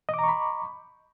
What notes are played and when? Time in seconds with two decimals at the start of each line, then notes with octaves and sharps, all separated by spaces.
0.09 D#5
0.14 D6
0.19 A#5
0.24 C#6
0.29 B5